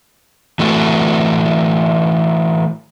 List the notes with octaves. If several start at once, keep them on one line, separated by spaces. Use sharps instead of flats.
E3 A3 F#4